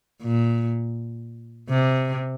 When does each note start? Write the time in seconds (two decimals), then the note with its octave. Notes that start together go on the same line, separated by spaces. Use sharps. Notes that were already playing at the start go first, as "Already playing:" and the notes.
0.22 A#2
1.70 C3